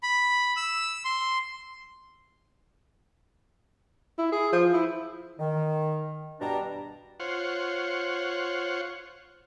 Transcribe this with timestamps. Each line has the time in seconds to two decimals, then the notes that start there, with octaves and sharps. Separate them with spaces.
0.03 B5
0.56 E6
1.05 C6
4.18 E4
4.32 G#4
4.53 F3
4.73 E4
5.39 D#3
6.41 G2 B2 G3 D4 A#5
7.20 F4 C5 C#5 F#5